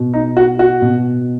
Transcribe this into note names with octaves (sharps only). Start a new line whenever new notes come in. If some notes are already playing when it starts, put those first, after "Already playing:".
Already playing: B2
D#4
F#4
F#4
B2